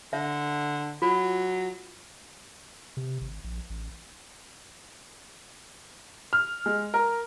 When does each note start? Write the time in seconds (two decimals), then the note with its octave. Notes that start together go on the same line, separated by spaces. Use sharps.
0.13 D3 E5
1.02 F#3 F4
2.97 C3
3.21 G#1
3.44 A#1
3.70 A1
6.33 F6
6.66 G#3
6.94 A#4